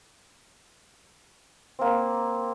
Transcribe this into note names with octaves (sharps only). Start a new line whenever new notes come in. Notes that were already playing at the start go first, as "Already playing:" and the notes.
A#3 C4